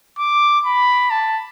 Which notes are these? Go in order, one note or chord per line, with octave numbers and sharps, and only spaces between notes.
D6
B5
A5